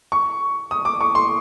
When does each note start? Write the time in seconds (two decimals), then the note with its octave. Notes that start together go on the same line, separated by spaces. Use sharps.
0.12 C#6
0.71 D#6
0.85 D6
1.01 C#6
1.15 C6